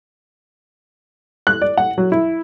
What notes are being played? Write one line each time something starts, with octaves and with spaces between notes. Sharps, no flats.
F#6
D5
F#5
F#3
E4